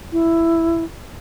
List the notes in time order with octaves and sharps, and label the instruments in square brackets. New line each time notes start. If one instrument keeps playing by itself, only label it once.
[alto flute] E4